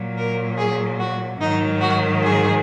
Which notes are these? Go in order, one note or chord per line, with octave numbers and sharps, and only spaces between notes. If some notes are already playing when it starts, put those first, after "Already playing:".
Already playing: A#2 F#3
A#4
G#4
F#4
G#2 D#3 F#3 D#4
F#4
G#4